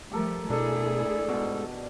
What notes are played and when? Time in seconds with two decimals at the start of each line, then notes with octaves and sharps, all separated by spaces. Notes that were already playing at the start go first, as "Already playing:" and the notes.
0.11 F3 G3 A3 G4 A4 A#4
0.50 B2 A3 D4 E4 G#4 A4
1.29 G#2 B2